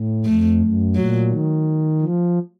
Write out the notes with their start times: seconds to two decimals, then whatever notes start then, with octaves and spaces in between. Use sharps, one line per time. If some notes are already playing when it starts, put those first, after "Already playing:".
Already playing: A2
0.25 F2 A3
0.60 F#2
0.95 A#2 F#3
1.30 D#3
2.02 F3